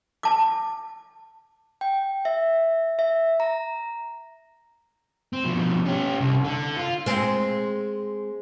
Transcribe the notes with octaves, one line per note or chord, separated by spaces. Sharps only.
A5 D6
G5
E5
E5
A#5
C4
B2 F3
C#4 G4
C2
D3
F4
G#3 C4